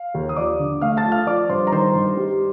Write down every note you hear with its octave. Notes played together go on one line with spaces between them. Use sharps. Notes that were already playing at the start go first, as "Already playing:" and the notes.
Already playing: F5
D#2
D#6
F3 D5 D6
D3
A3 F5 F6
A5 A6
F3
F5 F6
F3 D5 D6
G2 C5 C6
A#5
D#3 C5 C6
G2
G3